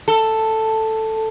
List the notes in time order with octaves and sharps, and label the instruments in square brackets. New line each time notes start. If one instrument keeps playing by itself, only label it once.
[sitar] A4